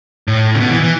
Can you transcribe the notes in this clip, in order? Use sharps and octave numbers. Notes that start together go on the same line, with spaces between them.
A2
C#3
B2
E3
E3